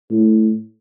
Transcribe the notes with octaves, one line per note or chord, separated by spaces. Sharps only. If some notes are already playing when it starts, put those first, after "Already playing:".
A2